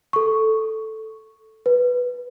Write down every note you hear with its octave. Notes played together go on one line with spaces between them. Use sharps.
A4 C#6
B4